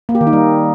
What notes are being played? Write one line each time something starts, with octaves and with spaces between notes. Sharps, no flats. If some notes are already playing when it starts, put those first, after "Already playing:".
A#3
G4
D#3
D#4
G3